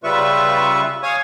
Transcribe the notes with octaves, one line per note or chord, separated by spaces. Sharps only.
C#3 G3 F4 B4 E5 C#6
C#5 F5 G#5 C#6 D#6